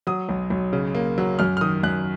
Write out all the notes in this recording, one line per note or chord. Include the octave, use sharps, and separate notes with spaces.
F#3 D#6
B1
B1
C#3
A#3
F#3
F#2 F6
F6
D#3 D#6
F#2 F#6